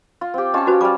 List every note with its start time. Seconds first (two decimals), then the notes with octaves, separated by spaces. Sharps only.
0.21 F4
0.34 C4 G4
0.54 C#4 F4 D#5 G5 A5
0.67 F#4 B4 C5
0.81 G3 F5 D6